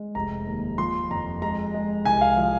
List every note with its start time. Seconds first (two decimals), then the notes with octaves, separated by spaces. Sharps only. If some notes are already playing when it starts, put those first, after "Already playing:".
Already playing: G#3
0.15 F1 A#5
0.47 D#2
0.78 F3 C6
1.11 F2 A#5
1.42 G#3 A#5
1.74 G#3
2.05 C2 G#5
2.21 F5
2.37 F3